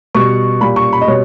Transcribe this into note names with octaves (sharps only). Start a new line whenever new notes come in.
B2 G3 C#6
A#2 G3 B5
C#6
B5
D#5
B2 G3 C#5